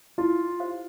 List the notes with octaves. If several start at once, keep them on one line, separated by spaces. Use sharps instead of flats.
E4 F4
G4 C5 F5